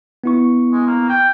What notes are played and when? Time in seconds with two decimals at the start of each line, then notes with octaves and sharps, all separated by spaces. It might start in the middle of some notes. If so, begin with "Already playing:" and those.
0.24 B3 E4 C#6
0.72 G#3
0.87 A#3
1.09 G5